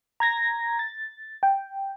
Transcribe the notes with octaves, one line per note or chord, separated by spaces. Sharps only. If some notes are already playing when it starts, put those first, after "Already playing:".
A#5 G#6 A#6
A6
G5